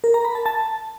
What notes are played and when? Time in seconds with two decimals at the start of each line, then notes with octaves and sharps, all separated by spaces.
0.04 A#4
0.14 A#5
0.25 B5
0.35 A5
0.46 A5